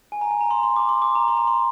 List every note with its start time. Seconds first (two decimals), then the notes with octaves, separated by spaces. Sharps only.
0.12 G#5
0.21 A#5
0.31 G#5
0.41 A#5
0.51 C6
0.63 C6
0.76 D6
0.89 C6
1.02 D6
1.15 A#5
1.28 C6
1.37 A#5
1.47 C6